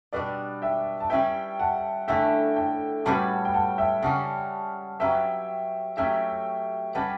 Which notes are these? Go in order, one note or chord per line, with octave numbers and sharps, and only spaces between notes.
B2 G3 D4 B4 D5
E5 G5
A5
G3 C#4 E4 B4 E5 G5
F#5 A5
D3 A3 C#4 E4 A4 E5 G5
E5 G5
A2 G3 C#4 F#4 B4 F#5 A5
G5
F#5 A5
E5 G5
C#3 G3 C#4 F#5 A5
F#3 C#4 G4 B4 E5 G5
F#3 A3 C#4 G4 E5 G5
G3 C#4 G4 B4 F#5 A5